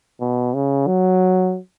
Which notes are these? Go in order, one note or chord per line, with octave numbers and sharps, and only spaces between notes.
B2
C#3
F#3